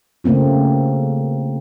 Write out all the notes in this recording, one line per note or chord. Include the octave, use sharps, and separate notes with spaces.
C#3 A3 A#3 C4 F4